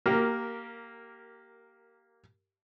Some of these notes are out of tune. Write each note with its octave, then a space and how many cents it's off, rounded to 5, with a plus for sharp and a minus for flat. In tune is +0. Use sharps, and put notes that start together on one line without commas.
A#3 +0 G4 -20 A#4 -10